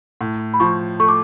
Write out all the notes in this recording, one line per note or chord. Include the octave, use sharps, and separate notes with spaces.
A2
B5
F3 C#6
A3 C#6
D6